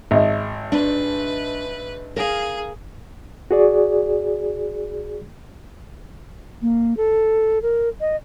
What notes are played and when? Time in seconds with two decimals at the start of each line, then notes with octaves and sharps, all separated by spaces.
0.11 G#1 D#5 E5
0.72 D4 B4
2.17 G#4 A#4 F5
3.51 F#4 G#4 D5
6.62 A#3
6.97 A4
7.62 A#4
8.01 D#5